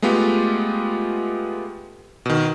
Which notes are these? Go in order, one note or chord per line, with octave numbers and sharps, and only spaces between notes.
G#3 A3 B3 F4 G4
B2 D#3